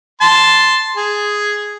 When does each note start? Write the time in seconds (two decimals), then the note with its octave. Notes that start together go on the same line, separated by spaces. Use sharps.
0.21 A5 C6
0.97 G#4